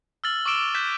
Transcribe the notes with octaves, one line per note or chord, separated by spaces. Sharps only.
E6 F6 A6 F#7
C#6 D6 E6 D7 E7 G7
F#6 G6 A6 B6 E7